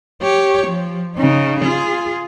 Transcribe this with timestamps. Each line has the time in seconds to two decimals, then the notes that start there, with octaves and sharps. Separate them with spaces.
0.22 G4 C#5
0.67 F3
1.16 C#3 D#4
1.60 F4 G#4